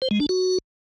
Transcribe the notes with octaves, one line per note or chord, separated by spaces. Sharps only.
C5
G#3
D4
F#4